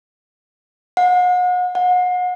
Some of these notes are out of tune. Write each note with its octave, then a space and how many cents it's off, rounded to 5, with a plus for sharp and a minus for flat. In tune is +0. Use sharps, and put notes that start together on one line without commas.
F#5 -40
F#5 -35